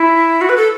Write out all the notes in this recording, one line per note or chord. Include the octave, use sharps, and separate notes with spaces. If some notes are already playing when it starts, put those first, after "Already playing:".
Already playing: E4
F#4
B4
A4